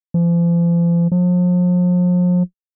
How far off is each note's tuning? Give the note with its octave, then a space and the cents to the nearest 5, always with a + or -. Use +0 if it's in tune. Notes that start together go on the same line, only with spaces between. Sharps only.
F3 -40
F3 +40